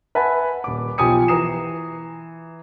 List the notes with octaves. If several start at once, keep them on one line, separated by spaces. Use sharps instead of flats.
B4 E5 F#5 G#5 A5 B5
D#1 D6
B1 F3 G4 G#5 D#6 C#7
E3 A#5 D#6 C7 E7